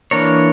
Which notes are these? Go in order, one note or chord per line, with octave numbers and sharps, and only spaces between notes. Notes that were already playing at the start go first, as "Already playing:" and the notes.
E3 A#3 D4 A#4 C#5